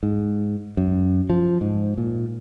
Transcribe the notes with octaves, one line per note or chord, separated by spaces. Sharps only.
G#2
F#2
F3
G#2
A#2